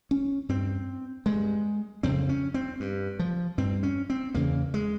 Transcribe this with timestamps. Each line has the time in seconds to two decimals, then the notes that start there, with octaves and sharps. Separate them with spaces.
0.11 C#4
0.49 G2 C4
1.26 G2 G#3
2.03 F2 C#3 C4
2.29 C#4
2.54 C4
2.80 G2
3.19 F3
3.58 G2 C4
3.83 C#4
4.10 C4
4.35 E2 C#3 A#3
4.74 G#3